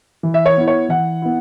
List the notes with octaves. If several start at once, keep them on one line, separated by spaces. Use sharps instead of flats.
E3
E5
C#5
B3 E4
C#5
E3 F#5
B3 E4